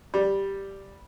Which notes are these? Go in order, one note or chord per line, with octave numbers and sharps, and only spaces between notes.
G3